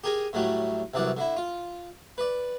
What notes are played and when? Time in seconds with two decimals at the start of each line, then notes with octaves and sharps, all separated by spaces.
0.04 G4 G#4 A#4 G#5
0.33 A2 F#3 G3 A3
0.94 C2 F#2 E3 D5 F#5
1.17 D3 E4
1.37 F4
2.18 B4 D5